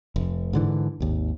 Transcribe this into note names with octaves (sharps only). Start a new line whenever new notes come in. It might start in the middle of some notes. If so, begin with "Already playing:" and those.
F1
G#2 D3 E3
G#1 D#2